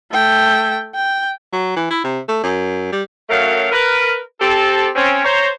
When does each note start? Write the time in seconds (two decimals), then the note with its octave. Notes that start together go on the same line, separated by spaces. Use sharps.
0.12 A3 G5
0.95 G5
1.53 F#3
1.77 E3
1.91 E4
2.04 C3
2.29 A3
2.43 F#2
2.92 G3
3.30 F#2 F#3 A3 A#4 F5
3.72 A#4 B4
4.41 C4 G4 A4
4.95 C4 C#4
5.25 C5 C#5 A#5